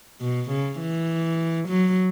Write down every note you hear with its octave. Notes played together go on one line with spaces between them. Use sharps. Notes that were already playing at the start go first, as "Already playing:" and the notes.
B2
C#3
E3
F#3